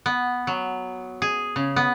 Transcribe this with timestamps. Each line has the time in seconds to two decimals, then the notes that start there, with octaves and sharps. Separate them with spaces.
0.06 B3
0.47 F#3
1.22 G#4
1.56 C#3
1.76 B3